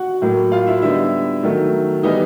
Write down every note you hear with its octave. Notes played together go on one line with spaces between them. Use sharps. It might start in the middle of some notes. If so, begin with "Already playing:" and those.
Already playing: F#4 F#5
A2 F#3 A#3
F4 F5
E4 E5
D3 G3 B3 D#4 E4 E5
D#3 F#3 A3
E3 G3 B3 D#4 D#5